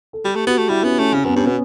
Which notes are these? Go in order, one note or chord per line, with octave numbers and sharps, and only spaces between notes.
A4
G3 G4
A3
B3 F#4
A3
G3 E4
B3 C#4
A3 C#4
C#3 C#4
F#2 B3
G2 C#4
B2 B3